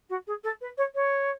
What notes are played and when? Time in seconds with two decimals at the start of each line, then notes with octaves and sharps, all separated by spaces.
0.09 F#4
0.27 G#4
0.43 A4
0.61 B4
0.77 C#5
0.95 C#5